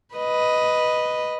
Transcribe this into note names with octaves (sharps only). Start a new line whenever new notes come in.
B4 D#5